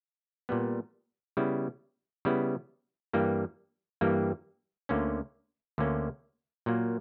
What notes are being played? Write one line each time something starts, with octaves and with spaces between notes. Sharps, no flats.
A#2 G3 B3
C#3 G3 B3 E4
C#3 G3 B3 E4
G2 E3 G3 A#3
G2 E3 G3 A#3
D2 D3 A#3 C#4
D2 D3 A#3 C#4
A#2 F#3 A#3